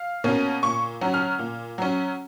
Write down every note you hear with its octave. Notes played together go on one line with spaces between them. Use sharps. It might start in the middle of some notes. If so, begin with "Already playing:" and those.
Already playing: F5
B2 A#3 C#4
A#2 C#6
F#3 C#4
F6
A#2
F#3 C#4